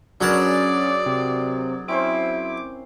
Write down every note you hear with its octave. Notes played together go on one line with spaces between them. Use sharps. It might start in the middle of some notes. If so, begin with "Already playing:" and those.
F#3 C#4 D4 G#4 A#4 B4 D5 A5
C3
C4 C#4 E4 C5 D6